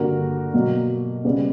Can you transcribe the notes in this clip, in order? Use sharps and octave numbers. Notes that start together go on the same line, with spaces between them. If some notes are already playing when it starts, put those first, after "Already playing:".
Already playing: G2 D3 A#3 F#4 A#4
B2 F#3 A#3
C#3 G3 B3